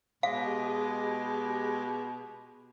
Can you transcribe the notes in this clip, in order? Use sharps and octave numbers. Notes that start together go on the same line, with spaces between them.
B2 G#3 G4 G#4 D#5 F5 G#5 D6